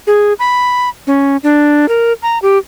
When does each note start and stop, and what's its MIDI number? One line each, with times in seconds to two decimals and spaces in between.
0.07 0.33 68
0.39 0.89 83
1.07 1.37 61
1.43 1.88 62
1.89 2.13 70
2.22 2.38 82
2.42 2.58 67